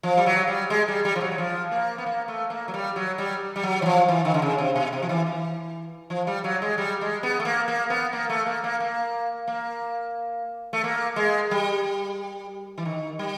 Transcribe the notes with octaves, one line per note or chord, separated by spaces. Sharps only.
F3
G3
F#3
G3
G#3
G3
G3
F3
F#3
F#3
F3
A#3
B3
A#3
A3
A#3
F#3
G3
F#3
G3
G3
F#3
E3
F3
E3
D#3
D3
C#3
C3
B2
C3
F3
E3
E3
F3
G3
F#3
G#3
G3
G#3
B3
A3
A#3
A#3
B3
A#3
A3
A#3
A#3
A#3
A#3
A3
A#3
G#3
G3
E3
D#3
G3